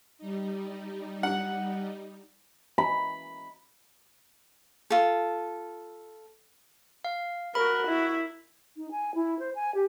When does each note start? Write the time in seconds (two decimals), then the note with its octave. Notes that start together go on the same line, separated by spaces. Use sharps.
0.18 G3 D#4
1.23 F#5
2.78 B5
4.90 F4 A4
7.05 F5
7.55 F#4 A#4 B5
7.88 E4
8.77 D#4
8.91 G#5
9.15 E4
9.39 C5
9.55 G#5
9.75 G4